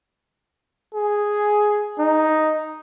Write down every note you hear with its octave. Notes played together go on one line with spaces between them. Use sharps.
G#4
D#4